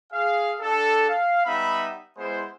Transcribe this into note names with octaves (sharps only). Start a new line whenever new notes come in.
G#4 F5
D4 G4 A4
F5
G3 B3 D#4 E5 B5
G#3 B3 E4 C5